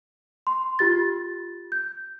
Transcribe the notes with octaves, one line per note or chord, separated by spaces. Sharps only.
C6
F4 G4 A6
G6